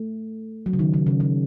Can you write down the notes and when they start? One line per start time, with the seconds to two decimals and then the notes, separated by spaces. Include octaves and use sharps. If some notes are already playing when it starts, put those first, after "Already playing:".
Already playing: A3
0.66 F#3
0.73 C#3
0.79 D#3
0.94 C#3
1.07 C#3
1.20 C#3